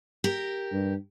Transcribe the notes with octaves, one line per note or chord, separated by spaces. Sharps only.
G4 A#4
G2